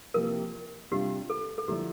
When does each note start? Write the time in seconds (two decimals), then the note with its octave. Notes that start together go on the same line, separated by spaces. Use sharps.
0.14 C3 F3 A#3 E4 G4 A#4
0.91 C3 G3 D4 F4 G4
1.30 A4
1.58 A4
1.68 D3 F3 A3 E4 G4 A#4